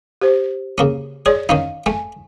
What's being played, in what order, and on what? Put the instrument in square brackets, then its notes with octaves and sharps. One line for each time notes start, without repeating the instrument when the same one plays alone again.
[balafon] G4 C5
[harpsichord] C#3 A#3 C#4
[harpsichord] G#4 [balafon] C#5 D5
[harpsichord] D#3 C#4 D#4 [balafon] F5
[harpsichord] A3 [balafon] G#5